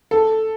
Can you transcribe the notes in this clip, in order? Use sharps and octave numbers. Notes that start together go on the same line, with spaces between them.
A4